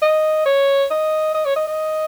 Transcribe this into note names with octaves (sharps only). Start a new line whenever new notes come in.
D#5
C#5
D#5
D#5
C#5
D#5
D#5